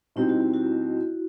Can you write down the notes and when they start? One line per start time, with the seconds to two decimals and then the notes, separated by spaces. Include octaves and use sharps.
0.16 B2 G3 C4 D#4 E4
0.29 F#4
0.41 F#4
0.54 F#4